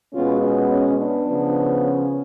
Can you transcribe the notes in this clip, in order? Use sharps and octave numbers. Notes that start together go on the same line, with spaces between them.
B2 G#3 B3 C#4 F4
C#4
C#4
B3 D4
C#3 F3 B3
C#4